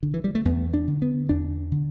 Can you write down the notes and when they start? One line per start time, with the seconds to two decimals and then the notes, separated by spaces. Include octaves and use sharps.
0.03 D3
0.14 E3
0.24 G3
0.35 A3
0.45 E2 B3
0.74 D4
0.87 D3
1.02 B3
1.29 E2 D4
1.72 D3